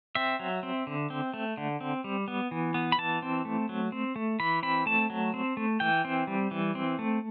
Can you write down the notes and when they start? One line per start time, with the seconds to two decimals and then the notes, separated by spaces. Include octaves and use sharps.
0.15 C4 E5
0.39 F#3
0.63 C4
0.87 D3
1.10 C4
1.34 A3
1.57 D3
1.81 C4
2.04 G3
2.28 B3
2.51 E3
2.74 B3
2.92 B5
2.98 E3 A5
3.22 C4
3.45 A3
3.69 F#3
3.92 C4
4.16 A3
4.40 E3 B5
4.63 C4 B5
4.86 A3 A5
5.10 F#3
5.34 C4
5.57 A3
5.80 E3 G5
6.05 C4
6.27 G3
6.51 E3
6.75 C4
6.99 A3